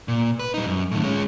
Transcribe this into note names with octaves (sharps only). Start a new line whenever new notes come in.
A#2
B4
G3 D#4
F#2
A2 D#3
G#3 C#4